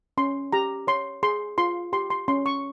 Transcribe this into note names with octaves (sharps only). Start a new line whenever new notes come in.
C#4 C6
G4 A#5
C#5 C6
G#4 C6
F4 C6
G4 C6
C6
C#4 C6
C#6